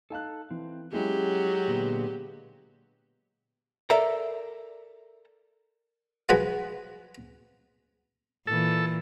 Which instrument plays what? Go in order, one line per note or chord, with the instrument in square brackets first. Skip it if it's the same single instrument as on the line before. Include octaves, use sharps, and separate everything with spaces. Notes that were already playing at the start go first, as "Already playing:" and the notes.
[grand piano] D#4 F5 F#6 [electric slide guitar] A4 G#5 A5
[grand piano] E3 [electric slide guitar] C4
[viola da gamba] F#3 G4 [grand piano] G#3 E4 G#4 [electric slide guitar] C#4
[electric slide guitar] A#2 D3 B3
[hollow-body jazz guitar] A4 A#4 D5 E5 A#5
[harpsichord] F3 G#3 F#4 B4 G#5 B5
[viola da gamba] A#2 E3 [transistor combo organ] A4